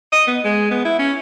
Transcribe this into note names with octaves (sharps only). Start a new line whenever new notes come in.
D#5
B3
G#3
B3
E4
C#4